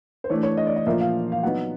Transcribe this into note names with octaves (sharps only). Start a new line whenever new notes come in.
C5
E3 A3 D4 C#5
C#5
D#5
D5
D#5
A#2 F3 A#3 E5
F5
F5
F#3 B3 D#4 F#5